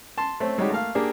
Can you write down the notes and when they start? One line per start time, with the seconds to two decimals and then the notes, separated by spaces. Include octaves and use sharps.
0.18 A5 C6
0.40 A3 C4 C#4
0.58 G3 G#3 C#4 D#4 F#4 G4
0.70 A3 A#3 F5
0.95 A#3 D4 G4 G#4